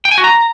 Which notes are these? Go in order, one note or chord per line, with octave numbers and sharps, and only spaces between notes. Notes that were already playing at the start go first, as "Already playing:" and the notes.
G5
G#5
F#4
A#5